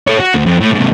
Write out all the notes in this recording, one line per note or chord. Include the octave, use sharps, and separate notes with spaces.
A4 C#5
F#4
D2
F2
A2
G#2 C3